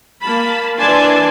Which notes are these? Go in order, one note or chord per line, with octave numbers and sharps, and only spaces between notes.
A#3 A5 B5
E3 D4 D5 G#5 A5 C6